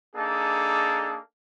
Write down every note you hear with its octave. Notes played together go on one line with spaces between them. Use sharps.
A#3 D4 D#4 G#4 A4